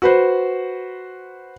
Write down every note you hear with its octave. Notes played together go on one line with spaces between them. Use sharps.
F#4 B4 C5